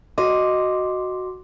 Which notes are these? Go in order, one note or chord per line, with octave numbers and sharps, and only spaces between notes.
F#4 D#5 C6 D6